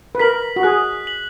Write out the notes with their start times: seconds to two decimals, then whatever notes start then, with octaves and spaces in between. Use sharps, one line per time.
0.15 B4
0.19 A#4 B6 F#7
0.56 F#4
0.63 G#4 F#6
1.07 B6 F#7